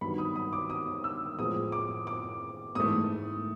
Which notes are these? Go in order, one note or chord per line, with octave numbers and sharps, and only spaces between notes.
G2 D#3 F#3 B3 B5
D#6
D#6
D6
D#6
E6
A2 F3 G#3 B3 D#6
D6
D6
G#2 E3 A3 D#6